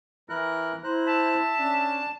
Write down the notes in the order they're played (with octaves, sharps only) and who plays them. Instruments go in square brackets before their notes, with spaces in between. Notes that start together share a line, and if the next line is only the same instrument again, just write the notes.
[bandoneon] E3 E4 F#6 [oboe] A#4
[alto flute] E4 [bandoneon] C5 F#6 [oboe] A#5
[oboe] E5 [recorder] A5
[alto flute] C#4 [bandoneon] D4